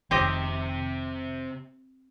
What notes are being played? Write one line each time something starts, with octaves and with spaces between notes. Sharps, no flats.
F1 C2 C3 D#3 C4 G4 D#5 G5